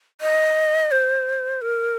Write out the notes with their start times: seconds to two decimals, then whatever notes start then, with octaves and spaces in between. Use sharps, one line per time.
0.21 D#5
0.92 C5
1.62 A#4